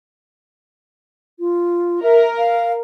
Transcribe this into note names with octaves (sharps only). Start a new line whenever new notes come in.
F4
A#4 E5
F5